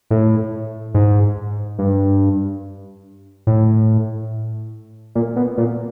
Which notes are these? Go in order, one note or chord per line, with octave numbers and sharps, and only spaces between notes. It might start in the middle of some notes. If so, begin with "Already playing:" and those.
A2
G#2
G2
A2
A#2
B2
A#2